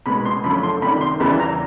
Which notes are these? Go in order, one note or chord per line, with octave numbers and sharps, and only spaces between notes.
B2 G#3 B3 B5
C6
F#2 D3 F3 A3 B5
C6
C3 D#3 G3 B5
C6
E2 C#3 E3 G3 B3 B5
A#5